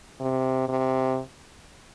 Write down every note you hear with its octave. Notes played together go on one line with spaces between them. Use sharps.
C3
C3